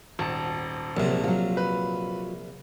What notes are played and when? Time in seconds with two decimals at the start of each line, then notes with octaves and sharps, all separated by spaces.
0.19 D#1 G#1 A5
0.97 A#1 C3 F#3
1.24 F#3 F4
1.57 B4